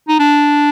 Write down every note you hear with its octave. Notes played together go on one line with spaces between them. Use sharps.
D#4
D4